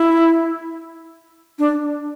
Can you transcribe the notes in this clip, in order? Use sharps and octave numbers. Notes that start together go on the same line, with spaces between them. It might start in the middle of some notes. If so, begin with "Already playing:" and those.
Already playing: E4
D4